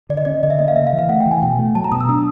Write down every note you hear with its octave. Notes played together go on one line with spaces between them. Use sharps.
D3 D5
D#5
C#4 D5
D3 D#5
E5
A#3 D#5
F5
C#3 E5
F5
E3
F5
A3 F#5
G5
E3
G#5
B2 G5
A3
F#3 A5
A#5
B2 D#6
E6
D4 D#6